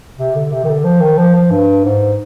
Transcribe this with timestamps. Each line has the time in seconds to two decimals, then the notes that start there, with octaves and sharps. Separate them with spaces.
0.18 C3
0.35 D3
0.52 C3
0.64 D#3
0.69 D3
0.84 F3
1.01 D#3
1.18 F3
1.35 F3
1.51 G2
1.85 G#2